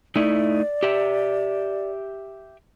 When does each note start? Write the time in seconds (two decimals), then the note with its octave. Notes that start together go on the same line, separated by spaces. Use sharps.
0.16 A3 D#4 E4 D5
0.83 G4 E5